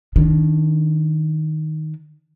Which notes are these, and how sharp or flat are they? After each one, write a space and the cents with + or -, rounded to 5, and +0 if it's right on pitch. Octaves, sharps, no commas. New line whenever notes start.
D#3 +0 D4 -20